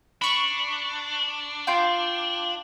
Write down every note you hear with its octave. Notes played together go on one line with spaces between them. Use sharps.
D4 B5 C#6
F4 G5